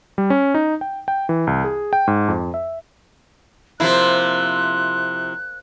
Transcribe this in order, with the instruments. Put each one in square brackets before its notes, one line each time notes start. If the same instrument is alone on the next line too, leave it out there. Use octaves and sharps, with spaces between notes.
[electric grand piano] G3
C#4
D#4
G5
G5
E3
C2
G#4
G5
G#2
F2
E5
[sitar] C3 F3 E4 [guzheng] A#3 C5 [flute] F#6